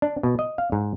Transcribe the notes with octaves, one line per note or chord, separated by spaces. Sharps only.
D4
B2
D#5
F5
G#2